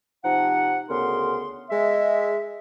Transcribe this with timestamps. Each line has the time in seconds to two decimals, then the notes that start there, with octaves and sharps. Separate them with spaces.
0.24 C3 F3 D#4 F#5
0.89 D2 C#3 B3 A#4 C6
1.70 G#3 E5